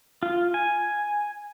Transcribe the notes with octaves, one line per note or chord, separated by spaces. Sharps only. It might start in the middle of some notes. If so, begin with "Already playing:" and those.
F4
G#5